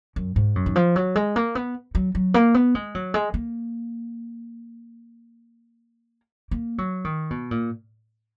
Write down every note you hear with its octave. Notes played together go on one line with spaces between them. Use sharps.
F#2
G#2
F#2
D#3
F3
F#3
G#3
A#3
B3
F#3
F#3
A#3
B3
G#3
F#3
G#3
A#3
A#3
F#3
D#3
B2
A#2